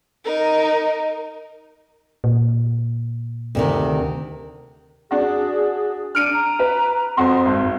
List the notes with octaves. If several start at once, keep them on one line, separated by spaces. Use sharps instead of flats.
D#4 A#4
A#2
D2 C3 D#3
D4 F#4 G#4
D4 F6 D7 D#7
A#5
B4
F2 C4 F#4 C6
G#1